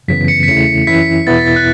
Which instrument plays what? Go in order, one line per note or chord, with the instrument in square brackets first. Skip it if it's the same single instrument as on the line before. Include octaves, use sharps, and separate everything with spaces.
[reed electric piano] F#2 C#3 E3 B3 [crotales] B6
[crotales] C#7
B6
[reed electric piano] E2 C#3 A3 E4 [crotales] C#7
[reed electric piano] F#2 E3 C#4 E4 [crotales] B6
[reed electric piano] E2 B2 B3 E4 [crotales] A6
[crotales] A6
F#6